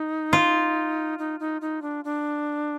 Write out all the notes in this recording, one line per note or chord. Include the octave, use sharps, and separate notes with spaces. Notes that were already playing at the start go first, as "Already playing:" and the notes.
Already playing: D#4
F4
D#4
D#4
D#4
D4
D4